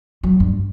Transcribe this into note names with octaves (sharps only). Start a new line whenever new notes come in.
F#3
G2